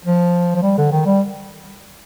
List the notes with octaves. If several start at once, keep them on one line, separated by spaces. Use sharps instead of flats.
F3
F3
G3
D3
D#3
G3